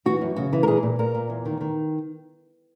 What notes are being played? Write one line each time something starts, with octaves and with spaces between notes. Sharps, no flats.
E3 F#4
F#2
C#3 F#4
E3
A#4
A#2 G#4
A#2
A#2 A#4
A#2
E2
D#3
D#3